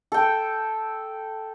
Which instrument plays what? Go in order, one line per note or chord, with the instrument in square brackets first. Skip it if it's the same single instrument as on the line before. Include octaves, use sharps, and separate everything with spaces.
[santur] A4 G5